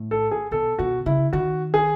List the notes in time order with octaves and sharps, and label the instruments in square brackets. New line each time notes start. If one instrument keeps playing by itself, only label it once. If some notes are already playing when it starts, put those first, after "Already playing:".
Already playing: [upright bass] A2
[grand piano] A4
G#4
[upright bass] B2 [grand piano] A4
[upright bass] B2 [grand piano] F#4
[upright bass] C#3 [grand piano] E4
[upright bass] D#3 [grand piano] F#4
[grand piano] G#4